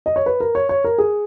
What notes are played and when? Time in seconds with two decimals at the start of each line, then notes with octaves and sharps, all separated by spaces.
0.06 D#5
0.16 C#5
0.26 B4
0.40 A#4
0.55 C#5
0.69 C#5
0.84 A#4
0.98 G#4